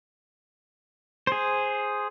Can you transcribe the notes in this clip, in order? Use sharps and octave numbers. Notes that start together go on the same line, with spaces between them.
G#4 C5